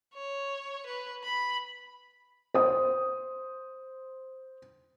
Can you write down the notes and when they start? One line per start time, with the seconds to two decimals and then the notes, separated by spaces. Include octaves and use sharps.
0.14 C#5
0.86 B4
1.23 B5
2.54 C5 D#6